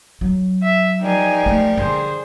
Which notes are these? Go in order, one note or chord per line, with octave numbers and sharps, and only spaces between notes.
F#3
E5
F3 G3 D#4 A#4 G#5
A3
D3 G#4 C5